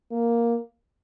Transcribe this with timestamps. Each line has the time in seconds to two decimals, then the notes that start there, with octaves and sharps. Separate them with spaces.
0.11 A#3